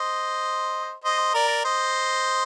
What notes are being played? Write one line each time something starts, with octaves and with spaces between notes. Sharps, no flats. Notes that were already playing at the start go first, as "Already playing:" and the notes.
Already playing: C5 D#5
C5 D#5
A#4 D5
C5 D#5